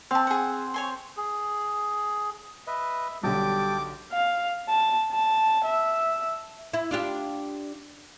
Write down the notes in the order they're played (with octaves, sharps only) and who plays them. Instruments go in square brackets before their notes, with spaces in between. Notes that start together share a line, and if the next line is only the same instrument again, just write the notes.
[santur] C4 [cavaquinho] F5 A5
[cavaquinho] G#4 F#5
C#5 G#5 C6
[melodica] G#4
[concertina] B4 D#5 [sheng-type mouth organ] E5
[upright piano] B1 D3 [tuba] G3 [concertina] G5 A5 [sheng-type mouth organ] D6
[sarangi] F5
A5
A5
E5
[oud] E4
D4 F4 G4